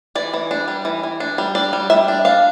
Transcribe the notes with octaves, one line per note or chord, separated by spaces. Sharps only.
E3 D5
E3
D4
G3
E3
E3
D4
G3
D4 D5
G3
G3 E5
D4
D4 F5